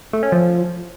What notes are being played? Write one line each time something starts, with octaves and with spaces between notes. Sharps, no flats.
A3
C#4
F3